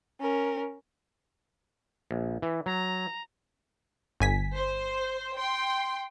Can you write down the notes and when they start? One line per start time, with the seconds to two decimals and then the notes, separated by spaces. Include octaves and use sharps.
0.21 C#4 A#4
2.11 A#1
2.42 E3
2.66 F#3 A#5
4.20 G1 G#5 B6
4.56 C5
5.38 G5 C6